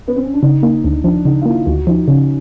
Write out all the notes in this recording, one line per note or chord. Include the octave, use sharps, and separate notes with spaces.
B3
C4
C#4
D4
C#3 D#4
A#3 D#4
D2 D4
F3 D4
C#3 D#4
F4
A#3 E4
D2 F#4
F3 D#4
C#3 C#4